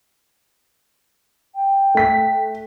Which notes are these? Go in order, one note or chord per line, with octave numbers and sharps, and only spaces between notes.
G5
A3 B6